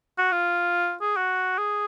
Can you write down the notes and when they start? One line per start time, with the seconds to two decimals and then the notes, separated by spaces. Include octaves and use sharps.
0.18 F#4
0.32 F4
1.02 G#4
1.17 F#4
1.58 G#4